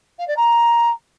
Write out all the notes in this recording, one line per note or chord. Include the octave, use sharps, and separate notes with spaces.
F5
D5
A#5